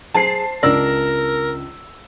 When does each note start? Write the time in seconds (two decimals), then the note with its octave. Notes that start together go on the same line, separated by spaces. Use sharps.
0.14 F#3 G#4 C5 A5 C7
0.63 C#2 D4 A#4 D5 E6 A#6